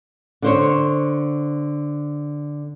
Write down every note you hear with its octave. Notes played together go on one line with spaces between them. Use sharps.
D3 C5 C#5